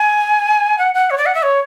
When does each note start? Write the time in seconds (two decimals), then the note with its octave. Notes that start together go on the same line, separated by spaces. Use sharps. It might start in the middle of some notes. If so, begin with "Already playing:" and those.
Already playing: G#5
0.78 F#5
0.94 F#5
1.10 C#5
1.18 D5
1.26 F#5
1.35 E5
1.43 C#5